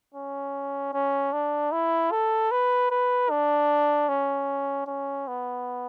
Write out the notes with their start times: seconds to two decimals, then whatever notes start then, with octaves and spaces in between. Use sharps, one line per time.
0.14 C#4
0.94 C#4
1.33 D4
1.72 E4
2.11 A4
2.51 B4
2.91 B4
3.30 D4
4.09 C#4
4.87 C#4
5.27 B3